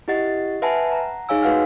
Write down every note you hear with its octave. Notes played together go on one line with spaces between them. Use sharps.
E4 G4 D#5 F#5 A6
B4 E5 F#5 G#5 A5 B5
F#5 A#5
D#4 G#4 C#5 F5 G#5 E6
A3 F#4 B4 F5 F#5 F6